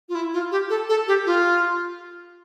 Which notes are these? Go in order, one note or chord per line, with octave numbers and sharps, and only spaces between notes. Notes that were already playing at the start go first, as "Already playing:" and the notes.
F4
E4
F4
G4
A4
A4
G4
F4